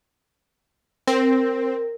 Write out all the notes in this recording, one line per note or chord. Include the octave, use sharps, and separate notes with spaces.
C4 A#4